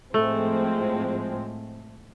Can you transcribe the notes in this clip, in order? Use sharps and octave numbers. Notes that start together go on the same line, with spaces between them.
A2 F3 G#3 A3 C4